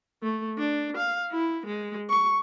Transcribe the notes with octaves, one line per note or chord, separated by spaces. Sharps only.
A3
D4
F5
E4
G#3
C#6